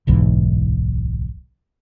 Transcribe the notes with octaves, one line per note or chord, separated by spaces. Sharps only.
D1 B1 G#2 E3